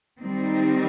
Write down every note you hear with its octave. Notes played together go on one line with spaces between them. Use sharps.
D#3 G3 C4 D#4